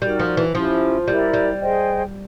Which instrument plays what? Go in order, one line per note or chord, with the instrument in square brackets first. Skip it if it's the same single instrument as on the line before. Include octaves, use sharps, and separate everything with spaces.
[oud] G3 [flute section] D#4 F#4 A#4 D5
[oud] F3
E3
[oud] F3 [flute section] C#4 E4 G4
[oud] G3 [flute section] E4 G4 A#4 D5
[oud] G3
[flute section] G#4 C5 D#5 G5